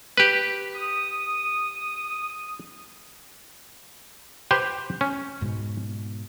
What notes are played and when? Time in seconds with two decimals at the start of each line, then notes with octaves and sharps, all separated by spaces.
0.17 G4 B4
0.74 D#6
4.51 G4 B4 C5
5.01 C#4
5.41 G#2 B2